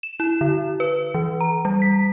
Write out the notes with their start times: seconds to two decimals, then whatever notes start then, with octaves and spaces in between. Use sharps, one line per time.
0.03 E7
0.20 E4
0.41 D3
0.80 B4
1.14 E3
1.41 A#5
1.65 G3
1.82 B6